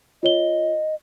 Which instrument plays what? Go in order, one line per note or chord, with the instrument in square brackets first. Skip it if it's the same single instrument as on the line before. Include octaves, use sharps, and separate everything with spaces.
[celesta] F4 C#5 G7 [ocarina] D#5